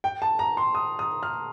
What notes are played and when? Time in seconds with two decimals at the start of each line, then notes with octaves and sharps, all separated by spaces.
0.04 G5
0.22 A5
0.39 A#5
0.57 C6
0.75 D#6
0.99 D#6
1.23 F6